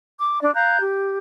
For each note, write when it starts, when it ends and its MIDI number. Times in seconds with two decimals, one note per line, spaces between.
0.19 0.42 86
0.42 0.53 62
0.42 0.53 74
0.54 0.80 77
0.54 0.80 82
0.54 0.80 90
0.54 0.80 91
0.80 1.18 67